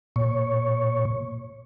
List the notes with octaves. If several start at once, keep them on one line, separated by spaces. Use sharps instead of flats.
A#2 C#5